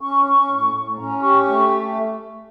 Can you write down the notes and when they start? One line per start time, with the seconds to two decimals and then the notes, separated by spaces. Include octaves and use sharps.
0.01 C#4 C#6
0.25 C#4
0.50 A2
0.74 A2
0.98 C#4 A#5
1.22 G4 C#6
1.46 A3 C#6